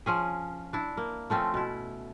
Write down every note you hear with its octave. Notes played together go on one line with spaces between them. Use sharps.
F3 C#4 G#4
D4 E4
A#3
F3 A3 C4 C#4
B2 E4